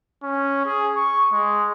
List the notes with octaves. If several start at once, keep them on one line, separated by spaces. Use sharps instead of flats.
C#4
G#4
C#6
G#3